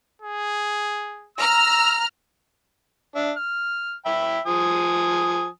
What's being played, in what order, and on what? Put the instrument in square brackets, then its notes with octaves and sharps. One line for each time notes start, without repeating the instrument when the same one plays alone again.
[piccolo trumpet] G#4
[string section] A#5 F6 [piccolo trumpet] E6
[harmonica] D4 E5
F6
E5 G5 B5
F3 G#5 D#6